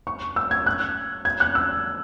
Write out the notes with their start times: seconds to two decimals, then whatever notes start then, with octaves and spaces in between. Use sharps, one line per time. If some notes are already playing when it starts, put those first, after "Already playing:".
0.07 C#6
0.36 E6
0.51 G#6
0.66 F#6
1.25 G#6
1.40 F#6
1.55 E6